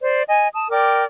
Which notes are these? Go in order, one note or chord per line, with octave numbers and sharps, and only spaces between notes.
C5 D5
D#5 G#5
A5 D#6
A#4 D5 G5 D6